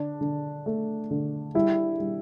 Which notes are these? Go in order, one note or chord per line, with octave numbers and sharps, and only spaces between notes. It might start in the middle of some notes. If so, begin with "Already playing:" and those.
Already playing: D3 D4
D3
A3
D3
G3 E4
G3